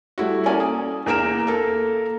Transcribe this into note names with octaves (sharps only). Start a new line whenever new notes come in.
G3 A3 E4 F#4
A#3 C#4 A4 D5 G#5
D#6
E2 A#3 A#4 D7 E7
A#3 A4 A#4